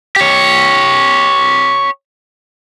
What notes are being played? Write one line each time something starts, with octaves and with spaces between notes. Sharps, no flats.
G4 C#5